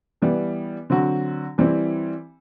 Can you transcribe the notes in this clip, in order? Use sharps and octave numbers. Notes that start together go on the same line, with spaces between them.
E3 G3 B3
D3 F#3 C4 F#4
E3 G3 C4 E4